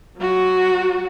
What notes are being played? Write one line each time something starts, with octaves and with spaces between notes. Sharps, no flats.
F#3 F#4